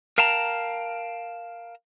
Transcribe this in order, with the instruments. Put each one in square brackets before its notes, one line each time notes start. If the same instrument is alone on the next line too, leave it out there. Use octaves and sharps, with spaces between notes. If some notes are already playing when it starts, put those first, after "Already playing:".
[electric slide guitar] A#4 F5 G5 A5 A#5